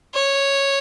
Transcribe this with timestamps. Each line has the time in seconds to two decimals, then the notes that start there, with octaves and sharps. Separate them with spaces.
0.14 C#5